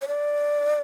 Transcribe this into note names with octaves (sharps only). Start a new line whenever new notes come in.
C#5
D5